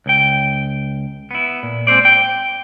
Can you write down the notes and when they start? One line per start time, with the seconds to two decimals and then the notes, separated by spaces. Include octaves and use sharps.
0.06 C#2 G5
1.31 B3 E4
1.63 A#2
1.87 G#3 C4 C#4 C5 D5
2.05 G5